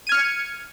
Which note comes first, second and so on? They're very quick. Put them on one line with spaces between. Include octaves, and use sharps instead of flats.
D#7 G#6 F6 C#7